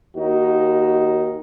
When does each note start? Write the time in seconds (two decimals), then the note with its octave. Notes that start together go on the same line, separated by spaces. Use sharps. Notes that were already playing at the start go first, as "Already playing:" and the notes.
0.17 D#2 D#4 F#4